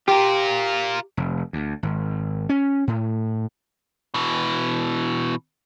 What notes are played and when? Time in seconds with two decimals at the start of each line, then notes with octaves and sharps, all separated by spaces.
0.08 F4 G4 A#4
1.17 F1
1.53 D2
1.83 G#1
2.49 C#4
2.87 A2
4.14 B2 E3